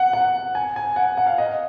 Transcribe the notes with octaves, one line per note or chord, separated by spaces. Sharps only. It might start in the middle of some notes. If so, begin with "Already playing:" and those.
Already playing: F#5
F#5
G#5
G#5
F#5
F#5
F5
D#5